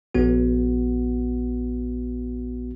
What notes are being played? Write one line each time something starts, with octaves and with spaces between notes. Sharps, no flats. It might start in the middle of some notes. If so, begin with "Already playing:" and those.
A#1 B3 F#4